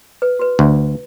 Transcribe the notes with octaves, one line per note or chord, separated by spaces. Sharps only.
B4
F#4 B4
D2